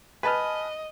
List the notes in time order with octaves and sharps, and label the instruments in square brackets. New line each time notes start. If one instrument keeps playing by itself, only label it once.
[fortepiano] B4 [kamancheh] D#5 [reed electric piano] G#5 A5 F6